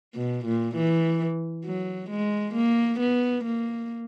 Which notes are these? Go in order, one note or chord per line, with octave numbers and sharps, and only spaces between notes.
B2
A#2
E3
F#3
G#3
A#3
B3
A#3